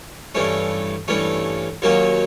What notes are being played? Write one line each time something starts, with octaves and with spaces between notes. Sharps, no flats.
G2 E3 A3 C#4
G2 E3 A3 C#4
D#2 D#3 F#3 A#3 C#4